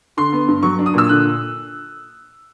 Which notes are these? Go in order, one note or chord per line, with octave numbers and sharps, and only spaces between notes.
D3 C6
B3
G2
F#3 C#6
D4
D#6
A#2 E6
D3 F#6